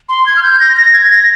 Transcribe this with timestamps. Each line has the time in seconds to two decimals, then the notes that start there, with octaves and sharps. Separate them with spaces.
0.09 C6
0.26 G#6
0.36 F6
0.43 G6
0.60 A#6
0.77 A#6
0.93 G#6
1.10 A#6